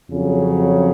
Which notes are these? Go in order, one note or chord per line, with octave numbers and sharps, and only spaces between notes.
F2 C#3 F#3